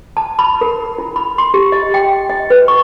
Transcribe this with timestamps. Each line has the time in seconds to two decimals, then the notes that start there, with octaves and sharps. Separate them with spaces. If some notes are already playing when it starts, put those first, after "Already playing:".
0.17 A5
0.39 B5
0.61 A#4
0.98 E4
1.16 B5
1.38 C6
1.54 G4
1.72 D#5
1.94 G5
2.29 D#5
2.50 B4
2.68 C#6